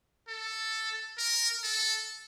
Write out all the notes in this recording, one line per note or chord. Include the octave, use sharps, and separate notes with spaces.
A4
A#4
A4